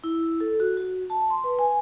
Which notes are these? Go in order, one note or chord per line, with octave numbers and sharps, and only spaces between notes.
E4
A4
F#4
F#4
A5
C6
B4
G#5